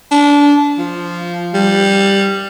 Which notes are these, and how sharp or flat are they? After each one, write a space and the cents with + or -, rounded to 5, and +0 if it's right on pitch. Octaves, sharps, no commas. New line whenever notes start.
D4 -25
F3 -5
G3 +5